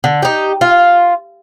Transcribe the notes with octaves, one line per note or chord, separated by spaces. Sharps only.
D3
D#4 G4
F4